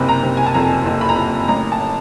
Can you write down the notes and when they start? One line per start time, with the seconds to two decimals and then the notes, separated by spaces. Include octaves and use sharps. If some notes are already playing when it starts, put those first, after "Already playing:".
Already playing: F#1 C3 B5
0.08 A#5
0.23 C3
0.37 G#5
0.46 A5
0.54 F2 A#5
0.85 F#1
1.01 B5
1.09 A#5
1.16 F#1 B5
1.48 A1 A#5
1.72 A5